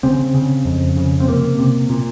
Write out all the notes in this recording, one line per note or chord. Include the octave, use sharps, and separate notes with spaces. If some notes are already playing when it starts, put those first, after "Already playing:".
C#3 C4
C#3
F2
C#3
C4
C3 A#3
C3
A#2